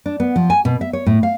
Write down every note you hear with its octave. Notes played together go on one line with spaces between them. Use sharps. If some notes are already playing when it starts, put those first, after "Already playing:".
D4
B3
F3
G#5
B2
E5
C#5
A2
F5